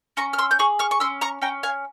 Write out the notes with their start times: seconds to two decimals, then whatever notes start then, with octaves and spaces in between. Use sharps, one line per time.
0.17 C#4 A#5 C#6
0.33 F6
0.39 C6 E6
0.51 G6
0.59 G#4 C#6 F6
0.79 C#6 F6
0.91 C#6
1.00 C#4 C6 E6
1.21 A#5 C#6
1.42 C#4 G5 A#5
1.63 F5 G#5